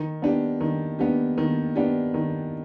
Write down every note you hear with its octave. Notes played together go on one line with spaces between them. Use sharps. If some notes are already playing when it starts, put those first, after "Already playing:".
Already playing: D#3
B3 D4 G4
D#3
B3 D4 G4
D#3
B3 D4 G4
D#3